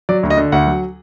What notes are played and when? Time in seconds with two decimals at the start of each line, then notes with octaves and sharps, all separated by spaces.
0.09 F#3 D5
0.23 D2
0.30 D#5
0.37 D3
0.52 D2 F#5
0.67 F#3